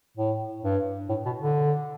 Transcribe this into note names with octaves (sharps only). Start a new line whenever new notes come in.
A2
G2
A2
B2
D3